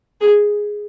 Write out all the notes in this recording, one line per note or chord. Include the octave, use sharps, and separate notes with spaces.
G#4